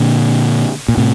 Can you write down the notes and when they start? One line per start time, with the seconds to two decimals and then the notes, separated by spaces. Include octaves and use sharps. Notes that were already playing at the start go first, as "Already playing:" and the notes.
Already playing: A#2 D3
0.88 A#2
0.97 A2 C3